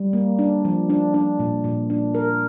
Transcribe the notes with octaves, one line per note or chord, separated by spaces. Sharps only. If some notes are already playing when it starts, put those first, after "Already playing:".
Already playing: G3
A#3
D4
F3
D4
D4
A#2
A#2
D4
A#4